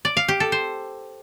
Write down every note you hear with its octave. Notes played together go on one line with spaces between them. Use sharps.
D5
F5
G4
A4
C5